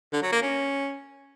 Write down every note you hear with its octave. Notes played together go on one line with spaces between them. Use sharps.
D3
F#3
A#3
C#4